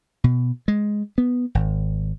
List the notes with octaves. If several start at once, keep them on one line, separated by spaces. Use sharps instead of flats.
B2
G#3
B3
G#1